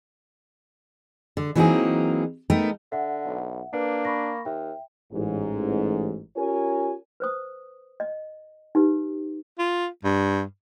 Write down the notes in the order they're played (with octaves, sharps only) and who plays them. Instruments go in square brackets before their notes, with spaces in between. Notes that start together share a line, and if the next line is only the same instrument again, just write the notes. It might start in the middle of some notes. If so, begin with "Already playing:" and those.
[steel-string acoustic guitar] D3
E3 F#3 A#3 C4 D#4 G#4
A3 B3 D#4 A#4 G5
[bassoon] D3 [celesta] E5 F#5
[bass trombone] B1
[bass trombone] A#3 [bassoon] D4 [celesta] B4
[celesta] B5 C#6 A#6
[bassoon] D#2 [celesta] E5 G5
[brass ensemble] A1 G#2
C#4 F4 G4 A#4 C#5 G#5
[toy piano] B4 C5 D#6
D#5
D#4 G4 B4
[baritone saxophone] F4
G2